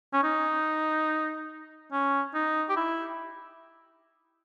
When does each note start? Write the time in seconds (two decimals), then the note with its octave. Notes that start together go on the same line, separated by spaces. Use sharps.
0.13 C#4
0.24 D#4
1.92 C#4
2.34 D#4
2.69 G4
2.77 E4